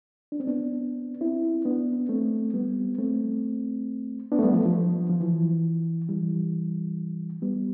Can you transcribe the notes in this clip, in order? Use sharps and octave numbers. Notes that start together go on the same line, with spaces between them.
D4
C4
B3 D4
C4 E4
B3 D4
A3 C4
G3 B3
A3 C4
B3 D4
A3
G3 B3
F3 A3
F3
F3
E3
E3 G3
G3 B3